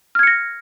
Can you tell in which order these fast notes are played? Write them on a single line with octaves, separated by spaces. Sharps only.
F6 G#6 C#7 A#6